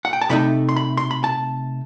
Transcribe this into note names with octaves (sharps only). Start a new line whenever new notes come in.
F#5
G5
A5
C3 D#3 A3 D#4 B5
C6
B5
C6
B5
A5